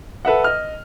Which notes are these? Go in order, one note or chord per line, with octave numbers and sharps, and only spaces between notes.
A4 B4 E5 F#5
D#5 F6